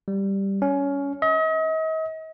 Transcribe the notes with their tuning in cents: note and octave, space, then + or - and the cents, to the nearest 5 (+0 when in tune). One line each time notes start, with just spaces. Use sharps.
G3 +0
C#4 +20
D#5 +40